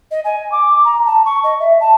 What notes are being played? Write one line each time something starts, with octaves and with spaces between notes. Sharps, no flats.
D#5
G#5
D6
A#5
A5
C#6
D#5
E5
A5